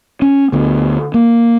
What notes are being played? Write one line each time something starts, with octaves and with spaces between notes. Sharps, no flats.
C#4
D2 D3 B3
A#3